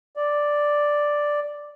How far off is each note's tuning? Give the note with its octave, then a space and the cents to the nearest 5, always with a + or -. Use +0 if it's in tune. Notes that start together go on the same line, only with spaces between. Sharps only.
D5 +0